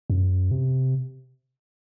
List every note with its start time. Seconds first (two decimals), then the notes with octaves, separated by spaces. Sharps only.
0.10 F#2
0.51 C3